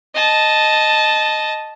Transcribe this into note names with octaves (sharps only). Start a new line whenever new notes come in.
D#5 A5